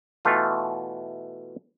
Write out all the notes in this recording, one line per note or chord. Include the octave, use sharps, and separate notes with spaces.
B2 E3 A3 F4